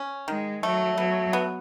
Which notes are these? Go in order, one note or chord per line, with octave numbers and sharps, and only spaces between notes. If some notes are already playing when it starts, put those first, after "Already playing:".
Already playing: C#4
D#3 G#3
F#3 A3
F#3 B3
B3